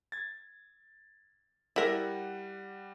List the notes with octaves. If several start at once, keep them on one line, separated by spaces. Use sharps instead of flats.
G#6 A6
G3 E4 A#4 F#5 A#6